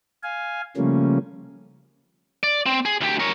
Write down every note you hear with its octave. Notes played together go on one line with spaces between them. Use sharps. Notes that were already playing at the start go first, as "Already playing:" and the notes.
F5 G#5
C#3 F3 G3 A3 A#3 C#4
D5
C4
G#4
D2 G4
A#4 C#5